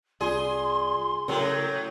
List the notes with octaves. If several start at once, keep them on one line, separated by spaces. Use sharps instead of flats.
C2 F4 G#4 D5 C6
A2 C#3 F#3 A#4